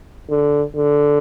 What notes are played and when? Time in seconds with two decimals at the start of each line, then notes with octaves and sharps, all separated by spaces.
0.29 D3
0.76 D3